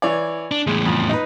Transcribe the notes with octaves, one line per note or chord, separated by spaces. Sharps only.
E3 C#5 D5
D4
E2 A2 G#3
F2
D#4 B4